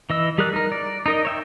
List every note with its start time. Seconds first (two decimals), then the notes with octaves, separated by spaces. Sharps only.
0.10 E3 D#5 E6
0.38 G3 G#4 A#4 D5 F#6
0.53 D#4 A#4
0.72 D5
1.06 D#4 A#4 D#5
1.25 C#5 E5 G5